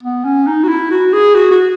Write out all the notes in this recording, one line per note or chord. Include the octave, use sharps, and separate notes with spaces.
B3
C#4
D#4
F#4
E4
F#4
G#4
F#4
F#4